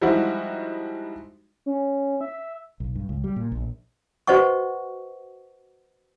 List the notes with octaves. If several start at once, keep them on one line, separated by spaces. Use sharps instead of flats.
F3 G3 G#3 D#4 E4 F#4
C#4
E5
B1
G2
C#2
G3
A#2
A#1
F#4 B4 C5 D#5 F#5 C#6